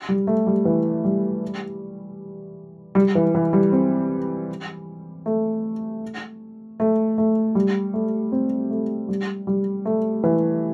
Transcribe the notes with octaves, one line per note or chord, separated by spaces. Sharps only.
G3
A3
G3
E3
G3
G3
E3
E3
G3
C4
A3
A3
A3
G3
A3
C4
A3
G3
G3
A3
E3